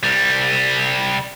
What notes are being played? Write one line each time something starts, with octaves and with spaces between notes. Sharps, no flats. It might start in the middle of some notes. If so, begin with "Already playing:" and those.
C2 G3